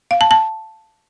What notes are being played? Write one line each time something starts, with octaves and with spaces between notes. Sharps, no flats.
F5
A5
A5